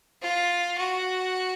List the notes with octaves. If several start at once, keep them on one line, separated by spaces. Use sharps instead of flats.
F4
F#4